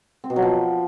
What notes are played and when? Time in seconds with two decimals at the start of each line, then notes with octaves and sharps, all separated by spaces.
0.24 C4
0.30 B2
0.36 F#3
0.42 F3